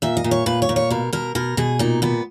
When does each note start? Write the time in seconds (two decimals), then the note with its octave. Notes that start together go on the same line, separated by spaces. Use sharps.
0.02 A#2 E5
0.17 D#5
0.24 A#2
0.31 C#5
0.46 A#2 B4
0.62 C#5
0.69 A#2
0.76 C#5
0.90 B2 A#4
1.13 B2 A#4
1.35 B2 A#4
1.57 B2 G#4
1.79 A#2 D#4
2.02 A#2 B3